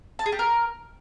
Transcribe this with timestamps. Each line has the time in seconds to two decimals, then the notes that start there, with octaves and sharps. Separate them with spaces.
0.19 A5
0.26 G#4
0.32 G4
0.39 A#4